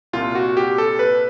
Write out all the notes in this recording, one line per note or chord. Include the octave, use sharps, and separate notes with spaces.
C2 A#2 F4
F#4
G4
A4
B4